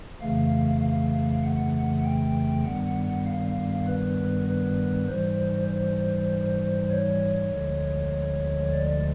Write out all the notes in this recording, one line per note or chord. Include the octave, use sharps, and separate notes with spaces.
F2 C#3 E3 A3 F5
F5
F#5
G5
G2 D#3 G3 B3 F#5
F5
B4
B4
G#2 E3 G3 C5
C5
C#5
D2 D3 F3 G#3
D5